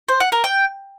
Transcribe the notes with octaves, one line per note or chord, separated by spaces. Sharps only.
C5
F#5
A#4
G5